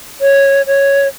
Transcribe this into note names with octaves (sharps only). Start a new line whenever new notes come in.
C#5
C#5